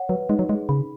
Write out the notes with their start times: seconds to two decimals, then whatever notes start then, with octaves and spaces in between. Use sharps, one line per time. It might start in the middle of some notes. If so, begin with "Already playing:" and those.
Already playing: C#5 F#5
0.09 F#3 B4
0.29 G#3 D#4
0.39 F#3
0.49 G#3 G#4
0.69 C#3 B5